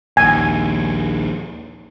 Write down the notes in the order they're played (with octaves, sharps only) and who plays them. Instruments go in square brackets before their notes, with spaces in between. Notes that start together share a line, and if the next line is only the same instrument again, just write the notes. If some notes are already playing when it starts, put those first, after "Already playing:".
[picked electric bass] A#1 D#2 [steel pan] G#5